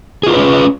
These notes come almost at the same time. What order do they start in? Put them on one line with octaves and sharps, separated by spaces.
G#4 F4 A#4 B4 C#4